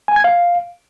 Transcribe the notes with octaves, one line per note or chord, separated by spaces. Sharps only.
G#5
G#6
F5